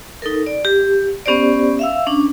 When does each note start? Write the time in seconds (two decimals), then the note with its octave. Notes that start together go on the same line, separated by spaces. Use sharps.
0.22 D#4 A4 A#4
0.46 D5
0.65 G4
1.26 B3 C#4 G4 C5 D5
1.79 E5 F5 E6
2.07 C#4 D4